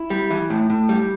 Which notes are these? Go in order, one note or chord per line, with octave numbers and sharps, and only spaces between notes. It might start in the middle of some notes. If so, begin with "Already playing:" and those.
Already playing: E4
G3
E3
A2
A2
G3